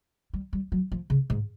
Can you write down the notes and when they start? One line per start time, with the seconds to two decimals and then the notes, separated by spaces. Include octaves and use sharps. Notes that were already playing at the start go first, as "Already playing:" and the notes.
0.33 G3
0.53 G3
0.72 F#3
0.92 F3
1.10 C#3
1.30 G#2